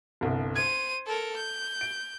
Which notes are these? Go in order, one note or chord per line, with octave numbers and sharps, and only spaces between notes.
G1 C2
C5 G#6 D#7
A4 A#4
G6
D7